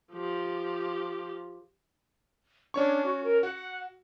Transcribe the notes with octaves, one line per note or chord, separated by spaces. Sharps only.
F3 G4
C#4 D4 C#5 C#6
F#4
A#4
F#4 F#5